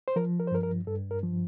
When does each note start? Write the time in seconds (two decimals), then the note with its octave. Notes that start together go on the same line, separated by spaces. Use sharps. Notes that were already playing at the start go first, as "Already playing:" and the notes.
0.08 C5
0.16 F3 A#4
0.40 A#4
0.47 C5
0.52 G2 A#4
0.63 A#4
0.87 G2 A4
1.11 A#4
1.23 F3